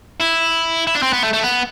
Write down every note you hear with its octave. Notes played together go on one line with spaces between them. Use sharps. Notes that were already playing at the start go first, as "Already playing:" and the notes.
E4
E4
D4
C4
B3
A3
A3
B3